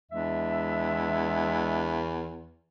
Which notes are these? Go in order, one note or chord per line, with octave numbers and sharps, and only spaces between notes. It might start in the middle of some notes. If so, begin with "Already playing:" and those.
E2 G#3 D4 E5